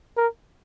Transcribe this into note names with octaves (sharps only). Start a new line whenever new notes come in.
A#4